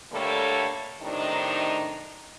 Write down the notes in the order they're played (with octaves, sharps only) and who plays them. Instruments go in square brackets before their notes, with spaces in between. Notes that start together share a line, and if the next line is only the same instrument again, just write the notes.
[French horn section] D3 G3 A3 A#3 A4 C#5
A2 C3 D#3 D4 D#4